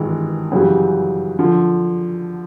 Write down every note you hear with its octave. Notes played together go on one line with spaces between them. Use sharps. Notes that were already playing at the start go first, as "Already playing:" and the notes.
Already playing: G#1 G2 E3 G#3
F#2 C#3 E3 G3
D3 F3